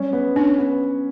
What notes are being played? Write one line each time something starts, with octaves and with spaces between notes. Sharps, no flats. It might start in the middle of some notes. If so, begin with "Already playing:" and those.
Already playing: G3 C#4
B3
C#4 D4
B3